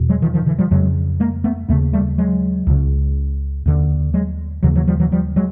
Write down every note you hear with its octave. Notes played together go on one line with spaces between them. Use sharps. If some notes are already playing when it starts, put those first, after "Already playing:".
Already playing: E2 B2
F#3 G#3
D#3 F3
D#3 F3
D3 E3
F3 G3
F2 C#3 F#3 G#3
G#3 A#3
A3 B3
D#2 C#3 A3 B3
G3 A3
F#3 G#3
C#2 C#3
D#2 D3
F#3 G#3
D#2 C#3 E3 F#3
E3 F#3
F3 G3
E3 F#3
F3 G3
F#3 G#3